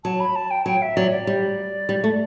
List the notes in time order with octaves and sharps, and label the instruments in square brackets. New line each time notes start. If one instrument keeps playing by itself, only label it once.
[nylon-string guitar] F#3 [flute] A5
[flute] B5
A5
G5
[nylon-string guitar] F#3 [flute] G5
[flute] E5
[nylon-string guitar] F#3 [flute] D5
[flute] D5
[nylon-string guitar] G3
G3
A3